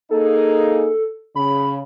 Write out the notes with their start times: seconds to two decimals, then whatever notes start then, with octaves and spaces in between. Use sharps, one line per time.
0.11 A#3 D#4 G#4 A4
1.36 C#3 B5